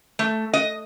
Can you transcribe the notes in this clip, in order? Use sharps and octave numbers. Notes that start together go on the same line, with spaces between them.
A3
D#5